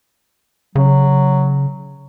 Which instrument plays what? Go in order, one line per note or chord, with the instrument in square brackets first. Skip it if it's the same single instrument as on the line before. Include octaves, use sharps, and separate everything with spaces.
[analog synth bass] C#3 [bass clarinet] F#3